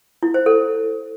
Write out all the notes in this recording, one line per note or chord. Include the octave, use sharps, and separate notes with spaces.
E4
C5
A4